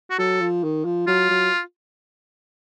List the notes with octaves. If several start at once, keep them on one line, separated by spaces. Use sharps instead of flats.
F#4
F#3 A4
F3
D#3
F3
F#3 F4
F#3